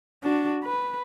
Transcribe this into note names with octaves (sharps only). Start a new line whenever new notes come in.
D4 F#4
B4